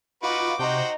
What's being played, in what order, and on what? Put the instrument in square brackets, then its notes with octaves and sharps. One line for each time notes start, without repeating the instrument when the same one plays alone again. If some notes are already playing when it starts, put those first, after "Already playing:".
[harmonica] D#4 F#4 B4 [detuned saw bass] F4 [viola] D6
[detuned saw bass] C3 [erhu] D#4 [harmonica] F#4 C5 G5